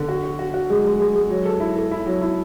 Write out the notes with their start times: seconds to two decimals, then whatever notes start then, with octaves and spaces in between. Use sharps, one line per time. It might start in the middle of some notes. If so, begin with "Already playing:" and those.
Already playing: D3
0.09 F#4
0.23 F#4
0.39 F#4
0.54 F#4
0.70 G#3
0.85 G#3
1.00 G#3
1.15 G#3
1.30 F#3
1.45 A4
1.60 E4
1.75 A4
1.91 E4
2.07 F#3
2.21 E4